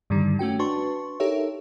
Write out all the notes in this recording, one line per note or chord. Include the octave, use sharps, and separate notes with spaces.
G2 D3 D#3 G3
A3 C#4 F#4 G5
D4 F#4 B4 A5 C6 C#6
D#4 G4 A4 A#4 C#5 E5